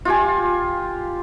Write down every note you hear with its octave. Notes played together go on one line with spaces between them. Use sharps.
F4 G4 G#5